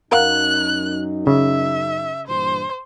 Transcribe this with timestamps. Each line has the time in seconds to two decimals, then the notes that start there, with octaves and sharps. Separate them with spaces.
0.12 F#2 D#4 A#4 F5 F#5 F#6
1.27 C#3 E5
2.27 G2 A#2 E3 C5